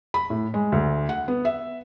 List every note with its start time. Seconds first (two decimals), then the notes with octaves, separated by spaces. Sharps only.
0.14 B5
0.30 A2
0.54 G#3
0.72 D2
1.09 F#5
1.28 B3
1.45 E5